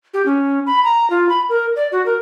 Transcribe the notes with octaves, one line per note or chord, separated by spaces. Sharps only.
G4
C#4
B5
A#5
F4
B5
A#4
D5
F#4
A#4